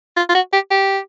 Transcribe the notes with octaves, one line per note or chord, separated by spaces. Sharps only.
F4
F4
F#4
G4
G4